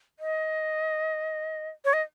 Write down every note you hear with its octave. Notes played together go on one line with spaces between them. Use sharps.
D#5
C#5
D#5